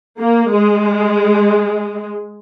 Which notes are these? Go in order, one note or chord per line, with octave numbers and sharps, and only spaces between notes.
A#3
G#3